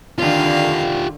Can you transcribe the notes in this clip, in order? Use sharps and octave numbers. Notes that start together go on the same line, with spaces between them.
D3 D#3 F4 G4 F5